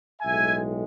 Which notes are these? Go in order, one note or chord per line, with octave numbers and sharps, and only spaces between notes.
B1 A2 G#3 E5 G#5